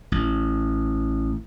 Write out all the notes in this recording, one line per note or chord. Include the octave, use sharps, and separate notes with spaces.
A1